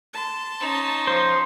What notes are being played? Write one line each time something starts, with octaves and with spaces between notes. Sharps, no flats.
A5 C6
C#4 D#4
F3 C5